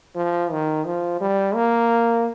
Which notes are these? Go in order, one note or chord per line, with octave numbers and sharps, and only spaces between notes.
F3
D#3
F3
G3
A#3